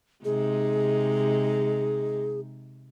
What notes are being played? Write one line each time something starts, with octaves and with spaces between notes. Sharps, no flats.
C3 G#3 D#4 G#4